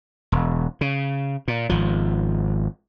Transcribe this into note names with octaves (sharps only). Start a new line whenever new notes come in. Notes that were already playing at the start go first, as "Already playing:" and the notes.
E1
C#3
A#2
G#1 F3